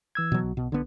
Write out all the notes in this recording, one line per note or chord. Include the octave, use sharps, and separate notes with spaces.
E3 E6 G#6
B2 F#3
B1
B2
D3 B3